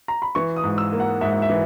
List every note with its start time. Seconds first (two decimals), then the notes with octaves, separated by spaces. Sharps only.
0.08 A#5
0.22 B5
0.35 E3 C#6
0.56 D#6
0.63 G#2
0.78 E6
0.93 A#3
1.00 F#5
1.21 G#2 E5
1.42 E5
1.50 E3